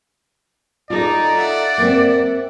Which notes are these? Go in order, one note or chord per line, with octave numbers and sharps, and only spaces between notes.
D#4 F4 A4 D5 A#5
E5 F#5
A#3 C4